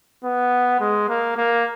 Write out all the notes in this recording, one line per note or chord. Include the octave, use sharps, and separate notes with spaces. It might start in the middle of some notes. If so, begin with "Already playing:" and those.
B3
G#3
A#3
A#3